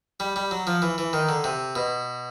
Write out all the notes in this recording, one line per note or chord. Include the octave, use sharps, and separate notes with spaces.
G3
G3
F#3
F3
E3
E3
D#3
D3
C3
B2